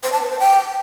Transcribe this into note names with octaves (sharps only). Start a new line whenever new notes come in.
C5
A5
B4
C5
G5